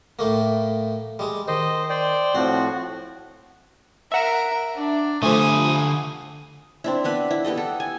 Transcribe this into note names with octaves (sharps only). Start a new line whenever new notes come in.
A2 A3 A#3
G3 G#3
D#3 C5 D#5
C5 D5 G5
A2 F3 C4 F#4
A#4 E5 F#5 E7
D4
D3 F3 A3 G#5 D#6
C4 D4 E4
B3 D4 B4
E4
B3 G4 A4 D#5
A4
G#5